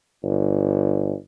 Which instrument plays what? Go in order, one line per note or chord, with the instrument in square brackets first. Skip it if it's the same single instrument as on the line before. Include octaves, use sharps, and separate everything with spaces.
[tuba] G1